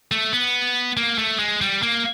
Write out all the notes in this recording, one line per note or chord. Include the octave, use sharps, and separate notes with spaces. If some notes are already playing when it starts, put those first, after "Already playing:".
A3
B3
A#3
A3
G#3
G3
A#3